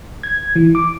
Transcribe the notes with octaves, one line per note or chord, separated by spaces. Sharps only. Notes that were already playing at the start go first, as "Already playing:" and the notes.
G#6
E3
D6